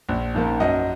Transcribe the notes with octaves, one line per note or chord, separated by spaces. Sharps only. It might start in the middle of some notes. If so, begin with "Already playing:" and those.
A#1
G#2 F3 A#3
F#2 D#5 F#5